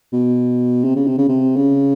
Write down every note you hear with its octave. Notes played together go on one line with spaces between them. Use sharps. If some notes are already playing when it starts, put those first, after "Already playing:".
B2
C3
C#3
C3
C#3
C3
C#3